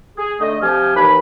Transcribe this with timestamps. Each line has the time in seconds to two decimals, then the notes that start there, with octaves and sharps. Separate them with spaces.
0.18 G#4
0.40 D3 A3 D#5
0.62 C3 F3 G4 F5 G#5
0.96 D#2 E3 B5